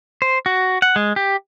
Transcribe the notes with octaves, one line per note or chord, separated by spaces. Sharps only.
C5
F#4
F#5
G#3
G4